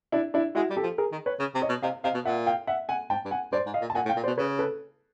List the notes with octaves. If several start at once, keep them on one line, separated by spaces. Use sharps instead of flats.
D4 E4
D4 E4
G#3 E4 F#4
G3
G4 A4
F3
G#4 A#4
D#3
B4 C#5
C#3
C3
C#5 D#5
B2
C3 D#5 F5
C3 D#5 F5
B2
A#2 E5 F#5
F5 G5
E5 F#5
F#5 G#5
G#2 G5 A5
G2
F#5 G#5
G2 C5 D5
G#2
D#5 F5
A#2
A5
A#2 F#5 G#5
A2
F5 G5
A#2
C5 D5
B2
C#3 B4 C#5
A4 B4